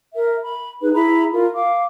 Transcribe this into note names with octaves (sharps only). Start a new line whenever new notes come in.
A#4 E5
B5
D#4 G#4 B4
E4 G#4 A#5 B5
F4 A#4
F5 D6